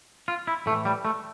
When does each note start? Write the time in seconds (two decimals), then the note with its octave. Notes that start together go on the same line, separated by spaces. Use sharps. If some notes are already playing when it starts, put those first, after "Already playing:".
0.28 F4
0.47 E4
0.66 A2 A3
0.71 E3
0.85 G3
1.05 A3